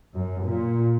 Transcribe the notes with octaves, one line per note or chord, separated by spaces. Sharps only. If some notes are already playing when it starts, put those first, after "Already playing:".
F#2
A#2